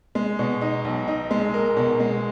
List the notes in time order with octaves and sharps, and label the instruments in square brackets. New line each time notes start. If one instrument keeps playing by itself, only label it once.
[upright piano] G#3
B2
D#4
B1
D#4
G#3
A#4
B2
G#3